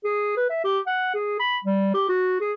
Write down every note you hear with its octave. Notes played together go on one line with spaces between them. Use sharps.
G#4
B4
E5
G4
F#5
G#4
B5
G3
G4
F#4
G#4